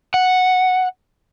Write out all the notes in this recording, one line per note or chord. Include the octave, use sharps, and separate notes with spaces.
F#5